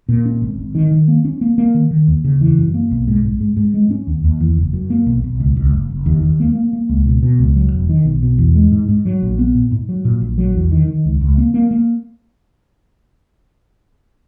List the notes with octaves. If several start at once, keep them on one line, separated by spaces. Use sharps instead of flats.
A#2
C#4
G#1
G#1
D#3
D#3
A#3
C#4
A#3
A#3
D#3
D#3
D#2
C#3
E3
F#2
A#3
B1
G#2
G#2
G#2
G#2
G#3
C#4
D#2
D#2
E2
F#1
F#2
A#3
B1
B1
C#2
C#2
F#1
F#1
D#2
D#2
A#3
A#3
A#3
C#2
B2
B2
C#2
F#3
E1
D#3
B1
B2
E2
G#3
G#2
G#2
F#3
A#1
B3
A#2
G#2
F#3
A#2
A#1
F#3
E2
D#3
D#3
C#2
C#2
A#3
A#3
A#3